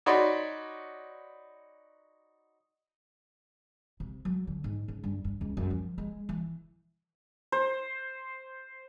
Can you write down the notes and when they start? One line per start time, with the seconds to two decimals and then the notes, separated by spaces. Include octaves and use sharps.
0.06 D#4 F#4 C#5 D5 B5 C6
4.00 C3
4.25 F#3
4.47 D3
4.64 G#2
4.88 C#3
5.04 G2
5.24 G2
5.41 C#2
5.57 F#2
5.70 F3
5.98 G#3
6.29 E3
7.52 C5